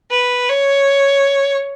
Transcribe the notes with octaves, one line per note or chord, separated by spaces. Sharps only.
B4
C#5